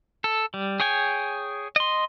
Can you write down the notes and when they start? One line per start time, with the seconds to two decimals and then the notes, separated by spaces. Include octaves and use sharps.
0.24 A4
0.54 G3
0.80 G#4 C#5 G5 G#5
1.76 D#5 C6